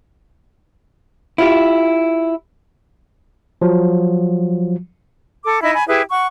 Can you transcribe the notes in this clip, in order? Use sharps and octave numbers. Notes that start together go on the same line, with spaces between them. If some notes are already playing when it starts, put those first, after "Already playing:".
E4 F4 G4
F3 F#3
A4 D6
D#4 E4 E5 B5
G#5 B5
E4 G4 G#4 B4
F#5 C#6